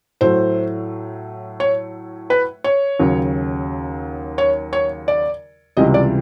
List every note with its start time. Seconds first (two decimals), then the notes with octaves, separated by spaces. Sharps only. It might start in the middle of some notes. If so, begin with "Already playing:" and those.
0.21 A2 F#3 A3 C5
1.60 C#5
2.30 B4
2.64 C#5
2.99 D#2 C#3 F#3
4.38 C#5
4.73 C#5
5.08 D5
5.77 C#2 C3 E3 G3 D#5
5.94 D5